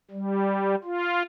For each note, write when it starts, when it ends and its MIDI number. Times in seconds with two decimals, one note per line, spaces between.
0.10 0.75 55
0.84 1.23 65